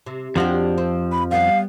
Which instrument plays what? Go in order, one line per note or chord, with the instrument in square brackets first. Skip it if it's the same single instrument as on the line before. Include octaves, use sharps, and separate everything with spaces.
[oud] C3
[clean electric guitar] F2 F3 [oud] D4 F#4 G4
[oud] C4
[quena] B5
[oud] G3 B3 [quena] F5